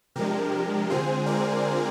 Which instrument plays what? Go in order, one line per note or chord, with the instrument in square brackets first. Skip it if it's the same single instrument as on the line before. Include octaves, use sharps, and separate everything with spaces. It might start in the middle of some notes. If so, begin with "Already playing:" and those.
[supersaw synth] C3 F3 G#3 D4 G4 A#4
D3 G#3 C4 F4 G#4 C5
A#4 D5